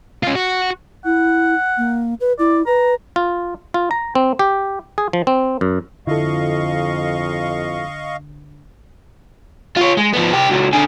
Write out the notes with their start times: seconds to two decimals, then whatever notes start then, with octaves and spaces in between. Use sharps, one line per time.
0.23 C#4 F4
0.36 F#4
1.05 E4 F#5
1.77 A#3
2.20 B4
2.39 E4 D5
2.66 B4 A#5
3.16 F4
3.74 F4
3.91 A#5
4.15 C4
4.39 G4
4.98 G#4
5.13 F3
5.27 C4
5.61 F#2
6.07 F2 D3 E4 F4 A4 D#5 F5 C#6
9.77 F4 C#5
9.97 G#3
10.13 F3 B3
10.32 C2 G4
10.50 C#2 F#3
10.73 D3 G#4